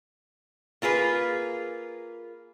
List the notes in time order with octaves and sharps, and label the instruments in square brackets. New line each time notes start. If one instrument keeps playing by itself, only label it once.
[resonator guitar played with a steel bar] A#3 F4 G#4 B4